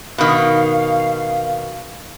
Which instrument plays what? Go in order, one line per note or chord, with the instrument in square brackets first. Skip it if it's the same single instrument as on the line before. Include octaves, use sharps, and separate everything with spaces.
[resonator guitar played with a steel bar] B2 D#3 [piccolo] F5